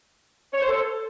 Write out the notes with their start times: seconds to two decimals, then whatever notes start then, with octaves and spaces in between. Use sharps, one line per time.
0.54 C#5
0.61 C5
0.69 A4